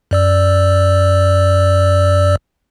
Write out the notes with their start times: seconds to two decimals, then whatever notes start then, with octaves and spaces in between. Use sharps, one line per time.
0.11 F#2 D5 E6